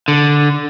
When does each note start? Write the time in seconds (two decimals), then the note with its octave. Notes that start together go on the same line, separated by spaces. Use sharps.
0.08 D3